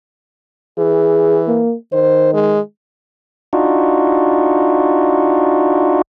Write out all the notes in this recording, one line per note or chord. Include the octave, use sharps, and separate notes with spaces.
E3 G#4
A#3
D#3 C5
G#3
D4 D#4 F4 F#4